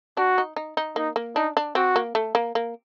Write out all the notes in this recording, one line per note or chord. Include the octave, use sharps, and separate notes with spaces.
D4 F#4
D#4
D#4
D#4
A#3 D#4
A#3
D4 D#4
D4
C4 F#4
A#3
A3
A#3
A#3